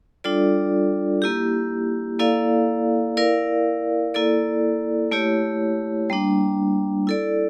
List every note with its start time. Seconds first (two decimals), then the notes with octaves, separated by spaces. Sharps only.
0.24 G3 D4 F4 A4 D5
1.22 A#3 E4 G4
2.19 A#3 E4 A4 D5 F5
3.17 E4 A#4 D5 F5
4.14 A#3 E4 A4 D5
5.11 A3 E4 G4 C#5
6.10 G3 A#3 D4
7.07 E4 A4 D5